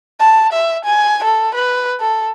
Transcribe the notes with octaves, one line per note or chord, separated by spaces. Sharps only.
A5
E5
G#5
A4
B4
A4